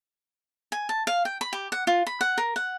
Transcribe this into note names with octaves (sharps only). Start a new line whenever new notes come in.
G#5
A5
F5
G5
B5
G4
F#5
F4
B5
F#5
A#4
F#5